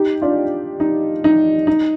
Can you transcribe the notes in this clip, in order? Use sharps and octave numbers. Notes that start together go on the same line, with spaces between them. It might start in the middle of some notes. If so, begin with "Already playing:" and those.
Already playing: D#4 G4
D4 F4
D#4
D#4
D#4